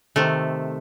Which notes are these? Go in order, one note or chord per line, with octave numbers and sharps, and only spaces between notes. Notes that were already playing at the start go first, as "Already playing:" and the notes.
C3 D#3 A3